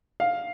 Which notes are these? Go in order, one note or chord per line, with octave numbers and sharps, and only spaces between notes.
F5